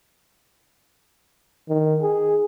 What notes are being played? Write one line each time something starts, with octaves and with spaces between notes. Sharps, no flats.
D#3
G#4